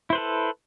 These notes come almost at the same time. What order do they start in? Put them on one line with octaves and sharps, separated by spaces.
E4 C5 B4 A4